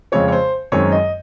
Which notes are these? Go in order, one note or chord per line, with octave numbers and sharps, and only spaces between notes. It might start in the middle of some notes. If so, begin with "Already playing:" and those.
F2 C#3 G#3 C4 C#5
C#5
C5
F#2 D#3 G#3 C4 C#5
D#5